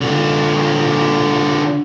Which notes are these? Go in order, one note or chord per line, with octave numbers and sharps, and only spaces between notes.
D3 F4